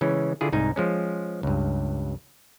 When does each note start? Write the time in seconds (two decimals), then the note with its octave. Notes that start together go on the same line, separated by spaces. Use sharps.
0.01 C#3 E3 G#3 C#4
0.41 D3 E4 F4 G#4
0.52 C2 G#2 D#4 G#5
0.76 F3 G#3 C#4
1.43 C#2 G2